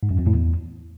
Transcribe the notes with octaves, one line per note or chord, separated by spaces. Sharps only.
G#2
F#2
F2
A2
E2